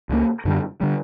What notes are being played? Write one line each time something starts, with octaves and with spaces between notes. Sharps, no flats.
C#2 C#3 E3 A#3
F#2 D3 G3
D3 G3